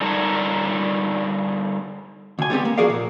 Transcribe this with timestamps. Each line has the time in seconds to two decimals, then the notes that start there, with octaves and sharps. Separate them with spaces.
0.01 D3 G3 D#4 A4 A#4 C#5
2.39 D2 G#5
2.50 G3 B3 C4 G4
2.65 A#3
2.78 F3 F#4 G#4 A#4 D5 F5
2.90 A#2